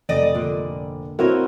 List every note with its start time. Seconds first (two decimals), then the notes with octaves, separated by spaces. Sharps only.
0.09 F1 D5 D#5
0.35 A#2 D3
1.19 C4 E4 F#4 A#4 C#5 D#5